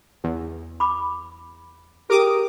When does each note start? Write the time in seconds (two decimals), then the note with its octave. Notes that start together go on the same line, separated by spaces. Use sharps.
0.24 E2
0.80 B5 D6
2.10 G4 G#4 A#4 D6 D#6